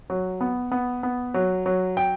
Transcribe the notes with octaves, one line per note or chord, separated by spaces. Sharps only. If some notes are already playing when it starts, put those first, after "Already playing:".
F#3
B3
B3
B3
F#3
F#3
G5